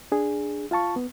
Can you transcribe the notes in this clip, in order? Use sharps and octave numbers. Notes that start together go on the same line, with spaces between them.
D4 G#4
F4 F5 A5 C#6
B3